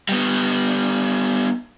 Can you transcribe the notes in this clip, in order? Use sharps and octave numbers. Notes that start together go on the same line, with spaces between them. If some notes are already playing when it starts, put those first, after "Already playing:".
G3 B3